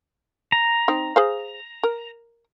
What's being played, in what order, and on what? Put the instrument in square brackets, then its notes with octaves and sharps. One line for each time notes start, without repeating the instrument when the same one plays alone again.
[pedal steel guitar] A#5
[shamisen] C4 D#4
G#4 C5 F5
A#4